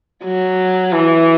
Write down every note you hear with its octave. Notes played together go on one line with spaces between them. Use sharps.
F#3
E3